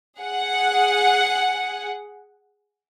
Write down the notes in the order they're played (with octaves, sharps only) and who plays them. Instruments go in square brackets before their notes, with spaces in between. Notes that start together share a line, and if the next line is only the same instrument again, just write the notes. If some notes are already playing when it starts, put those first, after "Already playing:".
[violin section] G#4 F#5